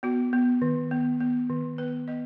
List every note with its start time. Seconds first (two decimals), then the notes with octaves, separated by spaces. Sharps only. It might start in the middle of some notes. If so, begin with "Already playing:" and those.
0.03 B3 F#4
0.33 B3
0.62 D#3
0.91 B3
1.20 B3
1.50 D#3
1.78 B3 B4
2.08 B3 D#5